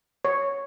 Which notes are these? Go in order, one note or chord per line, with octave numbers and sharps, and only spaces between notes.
C#5